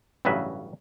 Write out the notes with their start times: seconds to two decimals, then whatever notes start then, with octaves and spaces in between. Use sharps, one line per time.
0.25 A1 G2 C#3 F#3 B4 E5